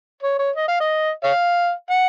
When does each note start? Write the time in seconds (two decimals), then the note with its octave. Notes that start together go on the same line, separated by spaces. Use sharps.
0.23 C#5
0.39 C#5
0.56 D#5
0.68 F5
0.80 D#5
1.24 C#5 F5
1.90 F#5